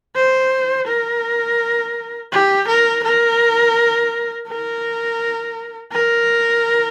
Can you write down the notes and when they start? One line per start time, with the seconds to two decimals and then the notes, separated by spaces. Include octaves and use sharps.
0.16 C5
0.88 A#4
2.32 G4
2.68 A#4
3.04 A#4
4.48 A#4
5.92 A#4